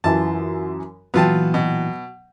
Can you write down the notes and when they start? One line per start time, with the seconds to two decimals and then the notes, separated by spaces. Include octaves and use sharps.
0.04 F#2 E3 F4 A5
1.14 A#2 E3 F#3 B3 F4 G5 A5
1.54 B2